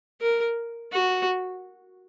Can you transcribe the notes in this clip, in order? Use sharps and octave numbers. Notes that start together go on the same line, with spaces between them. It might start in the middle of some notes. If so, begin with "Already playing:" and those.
A#4
F#4